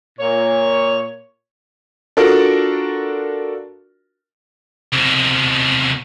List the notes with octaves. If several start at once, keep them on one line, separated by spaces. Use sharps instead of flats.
A#2 C#5
D4 F4 F#4 A4 A#4 D5
C2 B2